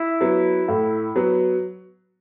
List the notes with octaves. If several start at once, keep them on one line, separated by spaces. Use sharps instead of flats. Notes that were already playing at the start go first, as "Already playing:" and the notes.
Already playing: E4
F#3 B3
A2
F#3 B3